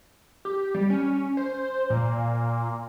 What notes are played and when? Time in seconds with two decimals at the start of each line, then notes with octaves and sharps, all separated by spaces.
0.45 G4
0.74 G3
0.90 C#4
1.37 C5
1.90 A#2